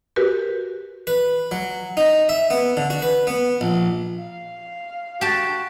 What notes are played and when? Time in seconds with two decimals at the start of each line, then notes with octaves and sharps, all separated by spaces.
0.16 F#4 G4 A#4 B4
1.07 B4
1.51 F#3
1.97 D#4
2.29 E5
2.50 B3
2.77 D3
2.90 F#4
3.02 B4
3.27 B3
3.61 A#1
4.19 F5
5.21 F#4 G4 A5